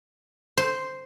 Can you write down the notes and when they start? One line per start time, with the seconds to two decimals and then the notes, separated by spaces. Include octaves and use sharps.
0.57 C5